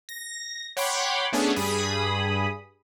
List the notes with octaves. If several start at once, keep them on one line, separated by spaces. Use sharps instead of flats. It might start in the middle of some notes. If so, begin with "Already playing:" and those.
A#6
C#5 F#5 G5 B5 C6 D6
A3 B3 C#4 D4 G#4
G2 G#4 B5 D#6